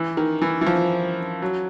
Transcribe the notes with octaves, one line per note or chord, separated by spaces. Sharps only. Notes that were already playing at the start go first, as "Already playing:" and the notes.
Already playing: E3
D#3
E3
E3
F3
F#3